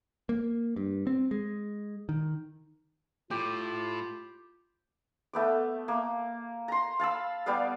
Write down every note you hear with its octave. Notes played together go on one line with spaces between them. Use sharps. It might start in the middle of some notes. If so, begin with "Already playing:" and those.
A#3
G2
C4
G#3
D#3
A2 F4 G4
A3 B3 D6
A#3
A#5 C6
F5 A5 B5 E6
G3 B3 D5 F5